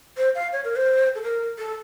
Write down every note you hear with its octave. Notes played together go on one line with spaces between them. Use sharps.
C5
F5
C#5
A#4
C5
A4
A#4
A4